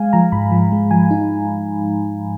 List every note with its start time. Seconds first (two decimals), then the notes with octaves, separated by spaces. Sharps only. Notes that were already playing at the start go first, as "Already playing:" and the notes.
Already playing: G#3 F5 G#5
0.13 F3 A#5
0.32 G#2 B5
0.52 F3
0.72 G#3
0.91 F3 G#5
1.11 D#4